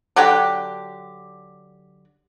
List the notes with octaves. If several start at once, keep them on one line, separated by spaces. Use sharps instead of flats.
D3 F#3 D4 G4